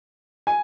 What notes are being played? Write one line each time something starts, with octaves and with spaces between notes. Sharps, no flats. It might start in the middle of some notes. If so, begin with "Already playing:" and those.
G#5